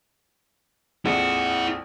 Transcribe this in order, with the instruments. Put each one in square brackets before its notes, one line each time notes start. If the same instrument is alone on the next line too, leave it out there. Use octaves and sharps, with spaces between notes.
[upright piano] A#1 F2 G#3 [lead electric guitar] E4 F#5